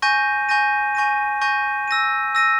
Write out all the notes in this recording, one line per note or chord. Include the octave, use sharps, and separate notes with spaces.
G#5 C#6 G6 A#6 D#7
G#5 C#6 G6 A#6 D#7
G#5 C#6 G6 A#6 D#7
G#5 C#6 G6 A#6 D#7
E6 A#6 D#7
E6 A#6 D#7